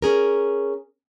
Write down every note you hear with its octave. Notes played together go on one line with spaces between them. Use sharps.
C#4 G#4 A#4